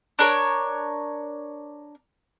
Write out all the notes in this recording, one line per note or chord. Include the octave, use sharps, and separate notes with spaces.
D4 A#4 C#5